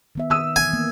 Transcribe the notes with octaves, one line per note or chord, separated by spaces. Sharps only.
D#3 B3 E5
D#3 D#6 E6 D#7
E3 G#5
A#3 B3